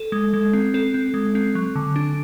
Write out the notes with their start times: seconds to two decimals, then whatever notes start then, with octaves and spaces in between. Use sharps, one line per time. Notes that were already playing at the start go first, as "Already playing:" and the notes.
Already playing: A4
0.12 G#3
0.34 G#3
0.53 C4
0.74 C4 A4
0.94 C4
1.14 G#3
1.35 C4
1.55 F#3
1.75 D3
1.96 D4